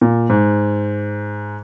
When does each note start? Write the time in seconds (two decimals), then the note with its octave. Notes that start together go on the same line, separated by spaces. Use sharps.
0.01 A#2
0.30 G#2